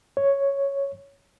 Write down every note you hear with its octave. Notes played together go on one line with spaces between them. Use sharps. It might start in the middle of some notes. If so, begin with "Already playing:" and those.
C#5